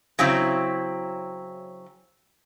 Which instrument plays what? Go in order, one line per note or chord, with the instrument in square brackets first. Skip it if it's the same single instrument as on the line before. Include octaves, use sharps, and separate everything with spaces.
[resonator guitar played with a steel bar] C#3 F#3 C4 E4